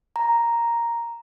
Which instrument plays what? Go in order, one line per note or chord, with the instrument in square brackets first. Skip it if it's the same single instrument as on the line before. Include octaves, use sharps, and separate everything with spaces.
[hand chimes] A#5